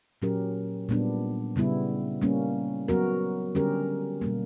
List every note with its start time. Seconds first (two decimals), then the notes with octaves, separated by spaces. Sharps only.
0.22 A#2 F#3 C#4 G4 A#4
0.89 A#2 G3 B3 D4
1.56 C#3 G3 B3 E4
2.22 G3 A#3 C#4
2.88 F#3 B3 F#4 A#4
3.55 D3 G3 C#4 G4 A#4
4.21 B2 G3 A#3